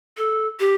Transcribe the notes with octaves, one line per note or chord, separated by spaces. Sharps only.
A4
G4